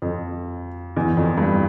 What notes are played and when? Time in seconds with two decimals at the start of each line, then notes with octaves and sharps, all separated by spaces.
0.02 F2
0.96 E2
1.17 F2
1.38 G2